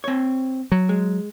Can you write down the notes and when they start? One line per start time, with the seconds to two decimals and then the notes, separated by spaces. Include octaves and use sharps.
0.04 C4 C#5
0.72 F#3
0.89 G#3